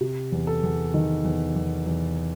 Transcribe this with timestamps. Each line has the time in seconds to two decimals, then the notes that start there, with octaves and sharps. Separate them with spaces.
0.01 C3
0.32 E2
0.47 A4
0.63 E2
0.94 D#3
1.24 E2
1.56 E2
1.86 E2